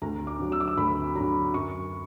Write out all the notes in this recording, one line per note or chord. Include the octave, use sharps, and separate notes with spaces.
D2 A#5
D6
D3 F#3
E6
D6
E6
D2 B5
D3 F#3 A#5
F#2 C#6